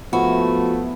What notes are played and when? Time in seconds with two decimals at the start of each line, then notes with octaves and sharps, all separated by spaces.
0.13 F3 A3 B3 E4 F#4